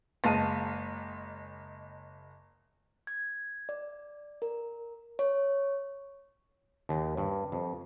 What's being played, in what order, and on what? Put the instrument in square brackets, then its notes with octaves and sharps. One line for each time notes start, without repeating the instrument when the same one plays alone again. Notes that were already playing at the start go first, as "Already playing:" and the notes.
[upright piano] F#1 G#3 F5 A5 D#7
[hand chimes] G#6
D5
A#4
C#5
[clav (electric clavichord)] D#2
G2
F2